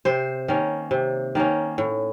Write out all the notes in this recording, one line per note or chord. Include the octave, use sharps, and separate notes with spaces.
C3 C5
D#3 A#3 C#4
C3
D#3 A#3 C#4
A2